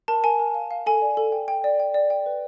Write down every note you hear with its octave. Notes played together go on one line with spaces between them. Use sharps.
A#4 A5
A#4 G#5
A#4
F5
F5
A4 G#5
D5
A4
G5
G5
D5
G5
D5
G5
B4